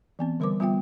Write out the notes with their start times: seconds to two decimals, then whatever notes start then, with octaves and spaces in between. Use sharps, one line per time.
0.19 E3 B3 C4
0.40 D3 G3 A#4 C5 D6
0.60 G3 B3 F4 E5 G5